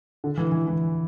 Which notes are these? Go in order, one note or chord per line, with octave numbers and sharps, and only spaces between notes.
D3
E3
E3
E3